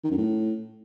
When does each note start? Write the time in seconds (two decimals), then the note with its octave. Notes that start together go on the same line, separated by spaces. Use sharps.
0.04 D#3
0.11 F#2
0.18 A2